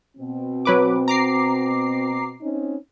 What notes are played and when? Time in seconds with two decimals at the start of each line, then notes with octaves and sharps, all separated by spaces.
0.17 B2 C4
0.65 F#3 B4 D6
1.08 A#5 D6 C7
2.41 C4 C#4 D#4